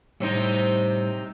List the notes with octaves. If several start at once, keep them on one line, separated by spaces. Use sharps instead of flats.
A2 C3 G3 C4 D#4 C#5